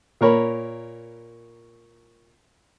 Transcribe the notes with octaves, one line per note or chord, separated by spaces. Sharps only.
A#2 A#4 C#5 B5